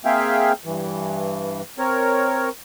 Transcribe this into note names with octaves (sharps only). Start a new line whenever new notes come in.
A#3 C4 G#4 E5 F5 G5
G2 E3
C4 A#4 C#5